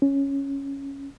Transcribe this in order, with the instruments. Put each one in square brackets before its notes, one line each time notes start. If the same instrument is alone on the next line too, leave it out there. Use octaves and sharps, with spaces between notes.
[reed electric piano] C#4